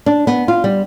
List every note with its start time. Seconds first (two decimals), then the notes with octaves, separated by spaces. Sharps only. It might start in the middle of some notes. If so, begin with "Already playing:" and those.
0.06 D4
0.27 B3
0.48 F4
0.64 G3